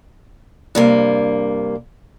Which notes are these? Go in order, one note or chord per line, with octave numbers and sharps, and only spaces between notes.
G2 C3 A#3